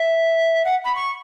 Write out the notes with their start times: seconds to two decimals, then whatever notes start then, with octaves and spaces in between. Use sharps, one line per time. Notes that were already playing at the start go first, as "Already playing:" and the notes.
Already playing: E5
0.65 F#5
0.84 B5
0.95 C#6